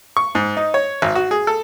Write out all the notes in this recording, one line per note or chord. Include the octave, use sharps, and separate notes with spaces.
C#6
G#2
D#4
C#5
G#1
F#4
G#4
A4